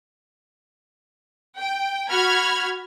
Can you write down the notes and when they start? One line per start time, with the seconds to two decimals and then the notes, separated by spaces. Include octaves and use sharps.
1.60 G5
2.10 F#4 B5 F6 G#6